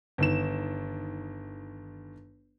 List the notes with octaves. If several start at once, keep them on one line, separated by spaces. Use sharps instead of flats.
G1 D#3 E7